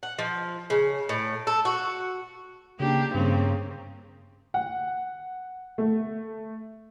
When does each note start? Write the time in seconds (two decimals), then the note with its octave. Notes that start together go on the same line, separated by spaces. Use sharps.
0.03 F#5
0.19 F3
0.70 C#3
1.09 A2
1.47 A4
1.65 F#4
2.80 C#3 A#3 D4 G4
3.15 G2 C#3 A#3 C4
4.54 F#5
5.78 A3